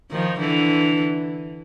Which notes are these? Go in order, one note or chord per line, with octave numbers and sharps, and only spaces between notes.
D#3 F3
D3 E3